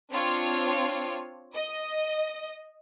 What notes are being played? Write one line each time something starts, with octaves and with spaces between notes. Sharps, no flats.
C4 D4 F4 C#5
D#5